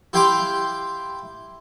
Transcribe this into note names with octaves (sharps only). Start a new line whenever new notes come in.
E4 G4 F5 G5 C6 D6